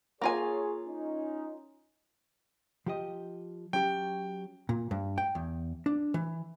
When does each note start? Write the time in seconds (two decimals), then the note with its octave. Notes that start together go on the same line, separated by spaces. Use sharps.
0.22 A#3 F4 G#4 C#5 G#5
0.87 C#4 D#4
2.86 F3 G4 D#5
3.73 F#3 C#4 G4 G5
4.69 A#2
4.91 G2
5.18 G5
5.35 E2
5.86 D4
6.14 E3